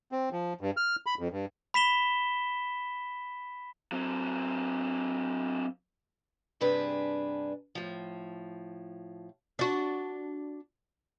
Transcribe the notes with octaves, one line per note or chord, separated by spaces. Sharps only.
C4
F3
G2
F6
B5
F2
G2
B5 B6 E7 G7
F#3 C4
G2 C3 D4 G#4 B4
A2 F3
D4 F#4